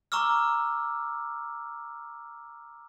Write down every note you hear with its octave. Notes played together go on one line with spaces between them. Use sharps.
A#5 C#6 D6 E6 F6